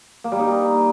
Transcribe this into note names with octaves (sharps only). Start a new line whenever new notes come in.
A#3
G3
D#4